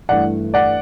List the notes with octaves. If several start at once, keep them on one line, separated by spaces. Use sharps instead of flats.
G2 E3 A3 D5 F#5
D5 F#5